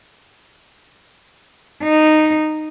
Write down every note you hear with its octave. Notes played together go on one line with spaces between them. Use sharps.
D#4